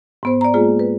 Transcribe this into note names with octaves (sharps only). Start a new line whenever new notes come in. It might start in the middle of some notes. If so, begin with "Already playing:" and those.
G#2 B3 C5
D5 A#5
G#3 A#3 F4 G#4
B4